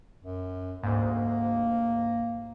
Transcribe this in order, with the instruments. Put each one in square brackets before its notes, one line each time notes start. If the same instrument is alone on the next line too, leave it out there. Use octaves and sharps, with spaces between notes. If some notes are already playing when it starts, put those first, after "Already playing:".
[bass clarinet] F#2
[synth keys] D2 G#2 [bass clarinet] A#3